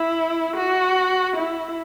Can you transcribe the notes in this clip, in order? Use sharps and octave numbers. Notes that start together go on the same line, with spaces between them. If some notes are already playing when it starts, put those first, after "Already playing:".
Already playing: E4
F#4
E4